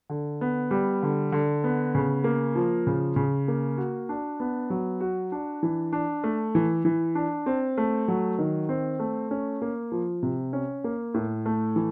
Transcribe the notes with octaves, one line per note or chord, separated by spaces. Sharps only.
D3
B3
G3
D3
D3
B3
C#3
A#3
F3
C#3
C#3
A#3
F#4
D4
B3
F#3
F#4
D4
E3
D4
A3
E3
E3
D4
C4
A3
F#3
D#3
C4
A3
C#4
A#3
F3
C3
C#4
A#3
A2
A3
E3